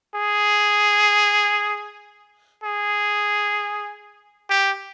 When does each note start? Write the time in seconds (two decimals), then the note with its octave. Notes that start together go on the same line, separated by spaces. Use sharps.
0.15 G#4
2.64 G#4
4.50 G4